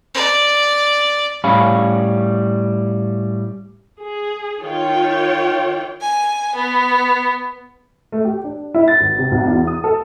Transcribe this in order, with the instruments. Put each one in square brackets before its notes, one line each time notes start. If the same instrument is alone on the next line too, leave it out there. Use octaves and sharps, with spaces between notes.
[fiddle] D5
[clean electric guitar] A2 G3 C#4 C#5 F5 B5
[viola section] G#4
D#3 F4 C#5 G5
[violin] G#5
B3
[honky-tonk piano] A3
G4
D4
E4
A6
G#1
C3
B1
E2
D#6
A4